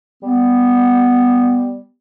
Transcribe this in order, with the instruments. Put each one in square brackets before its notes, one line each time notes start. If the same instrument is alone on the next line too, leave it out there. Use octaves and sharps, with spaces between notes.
[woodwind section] G3 B3